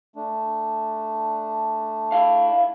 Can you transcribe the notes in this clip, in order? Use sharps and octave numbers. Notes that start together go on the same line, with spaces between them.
A3 D4
E4 F5